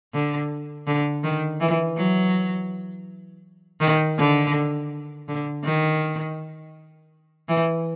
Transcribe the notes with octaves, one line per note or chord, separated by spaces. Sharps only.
D3
D3
D#3
E3
F#3
D#3
D3
D3
D#3
E3